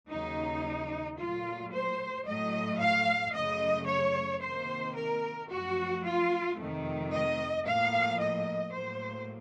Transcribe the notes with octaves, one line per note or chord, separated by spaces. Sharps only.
D#2 C#3 F#3 D#4
A#2 F#3 A3 F4
C5
A2 F#3 A3 D#5
F5
F#2 C#3 A3 D#5
C#5
C3 D#3 A#3 C5
A#4
F#2 F3 A3 F#4
F4
F2 C3 D#3 A3
D#5
A2 F3 A#3 F5
D#5
A2 F#3 A#3 C5